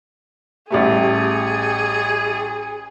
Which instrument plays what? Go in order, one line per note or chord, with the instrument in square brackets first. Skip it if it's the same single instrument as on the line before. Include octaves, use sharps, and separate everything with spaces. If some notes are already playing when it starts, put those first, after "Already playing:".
[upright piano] A1 G3 A3 [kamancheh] G#4